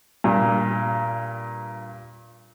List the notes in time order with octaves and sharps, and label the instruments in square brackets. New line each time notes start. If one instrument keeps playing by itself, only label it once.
[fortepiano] G2 A#2